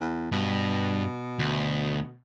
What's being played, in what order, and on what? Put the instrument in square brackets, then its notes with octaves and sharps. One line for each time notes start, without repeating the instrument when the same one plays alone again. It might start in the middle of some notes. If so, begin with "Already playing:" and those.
[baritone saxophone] E2
[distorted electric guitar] G2 [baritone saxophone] B2
[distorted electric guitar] D2